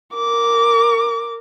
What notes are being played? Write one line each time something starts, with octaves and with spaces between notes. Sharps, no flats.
A#4 D6